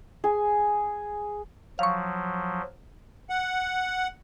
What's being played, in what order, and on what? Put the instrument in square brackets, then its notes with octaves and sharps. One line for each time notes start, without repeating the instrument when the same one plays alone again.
[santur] G#4
[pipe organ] F3 F#3 [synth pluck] F5 C#6
[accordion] F#5